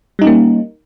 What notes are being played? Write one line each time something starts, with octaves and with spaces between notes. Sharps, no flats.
G3 A#3 C#4 D#4